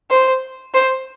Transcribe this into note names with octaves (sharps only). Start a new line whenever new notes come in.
C5
C5